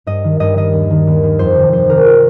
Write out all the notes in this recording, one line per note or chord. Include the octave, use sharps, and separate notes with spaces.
G2 D#5
D#3
G2 D#5
D#3 D#5
D#2
D#3
D#2
D#3
F2 C5
C3 D#3
F2 C5
C3 D#3 A#4
F4